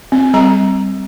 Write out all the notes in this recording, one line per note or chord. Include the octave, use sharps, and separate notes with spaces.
C4
G3 A#5